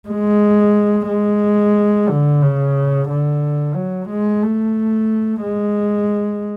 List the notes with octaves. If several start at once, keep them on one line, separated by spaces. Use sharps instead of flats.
G#3
G#3
D3
C#3
D3
F#3
G#3
A3
G#3